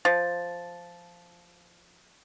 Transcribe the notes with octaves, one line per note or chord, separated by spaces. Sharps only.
F3 A6